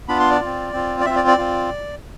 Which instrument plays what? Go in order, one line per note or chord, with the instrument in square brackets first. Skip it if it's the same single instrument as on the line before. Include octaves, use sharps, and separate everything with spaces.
[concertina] B3 D4 F4 B5
C6
D5
C4 F4
C4 F4
D5
C4 F4 E5
D5
D5
C4 F4